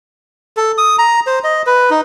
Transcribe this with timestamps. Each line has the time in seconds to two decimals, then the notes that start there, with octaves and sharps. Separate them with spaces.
0.57 A4
0.78 D#6
0.98 A#5
1.27 C5
1.44 D#5
1.67 B4
1.90 D#4